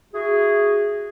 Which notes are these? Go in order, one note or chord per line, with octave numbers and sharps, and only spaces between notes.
E4 F#4 G#4